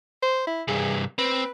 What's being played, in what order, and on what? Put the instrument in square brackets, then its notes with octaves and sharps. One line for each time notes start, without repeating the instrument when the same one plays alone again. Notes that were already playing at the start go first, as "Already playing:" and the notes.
[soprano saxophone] C5
E4
[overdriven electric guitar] C2 G2 [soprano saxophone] G#4
[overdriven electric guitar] C4 [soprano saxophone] B4